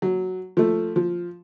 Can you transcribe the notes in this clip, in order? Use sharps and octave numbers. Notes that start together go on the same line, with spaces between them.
F#3
F3 A3
F3